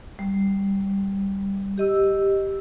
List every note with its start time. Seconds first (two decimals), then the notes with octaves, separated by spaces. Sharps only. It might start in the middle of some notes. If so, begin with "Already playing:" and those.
0.19 G3
1.78 G4 D#5 E6